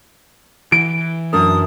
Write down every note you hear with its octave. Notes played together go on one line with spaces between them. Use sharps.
E3 D7
F#2 D4 A#4 D#6